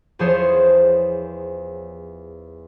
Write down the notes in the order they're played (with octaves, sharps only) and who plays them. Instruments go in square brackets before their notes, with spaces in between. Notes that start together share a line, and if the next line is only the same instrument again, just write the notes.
[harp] E2 F3 G#4 C5 C#5